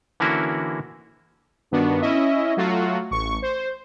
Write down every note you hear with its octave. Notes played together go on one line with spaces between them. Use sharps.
D3 E3 A#3 C#4 E4 F#4
G2 D#3 B3 D4 F#4
C#4 E4 D#5 E5
F#3 A3 F4 F#4
A1 C#6
C5